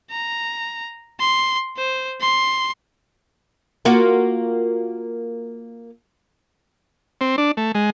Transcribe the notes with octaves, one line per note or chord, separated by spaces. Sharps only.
A#5
C6
C5
C6
A#3 F4 F#4
C4
D4
A3
G#3